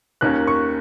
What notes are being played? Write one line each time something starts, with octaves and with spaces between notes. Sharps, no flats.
D#2 D#3 A#3 C#4 F#6
C#6